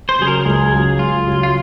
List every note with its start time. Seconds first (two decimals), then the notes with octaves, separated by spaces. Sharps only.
0.09 C5
0.18 C#3 F#3 G#4
0.27 A#4
0.45 C#2 G#4
0.72 C#3 F#3
0.99 C#2 F4
1.26 C#3 F#3
1.43 F4